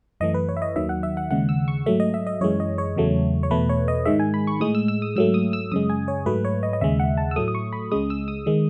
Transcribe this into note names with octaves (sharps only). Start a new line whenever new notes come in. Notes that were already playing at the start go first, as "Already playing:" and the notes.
F#2 E3 A3 D#5
B4
C#5
E5
D#5
D#2 D#3 F#3 E5
F#5
E5
F#5
D#2 C#3 G#3 F#5
E6
C#6
G#2 F#3 A3 E5
D#5
E5
D#5
F#2 E3 G#3 C#5
D#5
C#5
E2 C#3 F#3 A3
C#5
E2 B2 A3 B4
C#5
D#5
G#2 D#3 G#3 E5
G#5
B5
C#6
A2 G#3 D#6
E6
E6
D#6
G#2 F#3 A3 E6
D#6
E6
F#2 C#3 G#3 D#6
G#5
C#5
G#2 F#3 A3 B4
C#5
D#5
D#5
D#2 C#3 G#3 E5
F#5
A5
E6
A2 F#3 A3 D#6
D#6
C#6
B5
C#2 C#3 G#3 D#6
E6
D#6
D#3 G#3